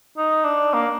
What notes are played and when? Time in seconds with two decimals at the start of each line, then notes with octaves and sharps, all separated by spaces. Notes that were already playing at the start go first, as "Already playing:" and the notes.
0.18 D#4
0.45 D4
0.74 A#3